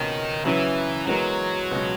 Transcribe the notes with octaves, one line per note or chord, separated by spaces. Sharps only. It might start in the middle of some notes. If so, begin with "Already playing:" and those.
Already playing: C#2 B2 D#3 A#3 C#4
C#3 E3 F#3 C#4 E4 B4
E3 F#3 G#3 B3 F#4 A#4
C#2 B2 G#3 C#4